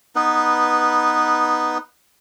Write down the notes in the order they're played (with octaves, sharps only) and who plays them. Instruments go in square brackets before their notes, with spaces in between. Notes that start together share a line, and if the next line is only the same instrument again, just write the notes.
[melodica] B3 D#4 B4